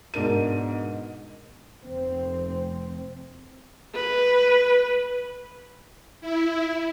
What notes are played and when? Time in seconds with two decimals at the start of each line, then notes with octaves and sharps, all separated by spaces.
0.14 G#2 B2 D4 A#4 D#7
1.84 F1 C4
3.95 B4
6.21 E4